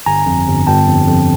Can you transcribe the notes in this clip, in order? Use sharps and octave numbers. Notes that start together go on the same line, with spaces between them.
G1 G#5 A#5
F2
G1
G1 G5 A5
F2
F2